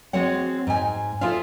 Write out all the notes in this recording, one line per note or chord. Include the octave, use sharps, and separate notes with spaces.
G#3 C4 F#4 C#5 F#5
G#2 G#5
F4 G#4 A4 C5 E5 F5